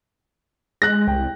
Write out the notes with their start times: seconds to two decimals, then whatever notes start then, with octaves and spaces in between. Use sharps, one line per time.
0.82 G#3 F#6 A#6
1.08 C2 G5